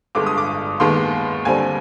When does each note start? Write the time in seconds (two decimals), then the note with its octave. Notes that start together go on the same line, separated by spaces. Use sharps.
0.15 G1 G2 D3 G#3 D6
0.26 D#6
0.38 D6
0.80 D#2 D#3 G#3 B3 C6
1.45 D#2 D3 G3 C4 G#5